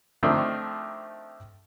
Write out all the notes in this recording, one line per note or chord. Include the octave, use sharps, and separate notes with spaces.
D#3 F3 A3 C4 D4 D#4